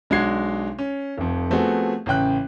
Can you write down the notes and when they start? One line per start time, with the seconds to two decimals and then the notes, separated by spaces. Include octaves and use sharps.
0.10 B1 G#3 D4 F#4 G#6 C7
0.79 C#4
1.18 F1 F2
1.50 F3 A3 B3 C4 F#4 G#4
2.06 A1 C#3 G5 F#6